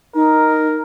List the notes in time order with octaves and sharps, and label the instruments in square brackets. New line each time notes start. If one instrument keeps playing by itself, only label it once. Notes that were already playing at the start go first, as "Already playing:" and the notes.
[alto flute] D#4 [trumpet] A#4